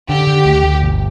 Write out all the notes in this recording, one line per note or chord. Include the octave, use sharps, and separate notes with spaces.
D3 G4
D3
D2
D2
G1